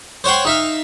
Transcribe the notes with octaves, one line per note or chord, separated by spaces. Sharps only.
C5 C#5 F#5 G5 C6
D#4 E5 F5